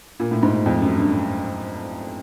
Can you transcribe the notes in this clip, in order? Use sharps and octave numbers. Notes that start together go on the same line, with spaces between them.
A#2
A2
G#2
F2
F#2
G2